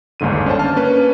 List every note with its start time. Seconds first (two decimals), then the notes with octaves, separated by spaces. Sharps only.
0.20 G1 D#2 G#2 D3 D#7
0.46 C#4 D4 C5 A5
0.59 A5 F6
0.76 A#3 C#4 B4